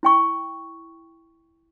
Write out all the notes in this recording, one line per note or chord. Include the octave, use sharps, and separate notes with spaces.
E4 G5 C#6